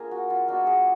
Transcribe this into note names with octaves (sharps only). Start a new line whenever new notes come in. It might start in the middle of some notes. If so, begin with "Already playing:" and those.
Already playing: A#3 D4 F4 G#4 A#4
F#4
F4
G#3 B3 D4 F4 F#4
G#4